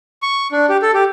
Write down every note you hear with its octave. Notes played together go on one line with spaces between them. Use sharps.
C#6
D4
G4
A4
G4